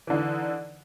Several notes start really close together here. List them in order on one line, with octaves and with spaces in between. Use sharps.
E3 D3 D#4